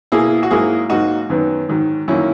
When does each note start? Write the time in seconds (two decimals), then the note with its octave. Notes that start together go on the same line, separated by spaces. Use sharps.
0.12 B2 A#3 E4 G#4
0.43 F#4
0.51 G#2 F#3 A#3 E4 G#4
0.90 G#2 F#3 A#3 D#4 F#4
1.30 F#2 D#3 F#3 B3
1.69 G#2 D#3 F#3
2.08 F#2 D#3 A#3 C#4 E4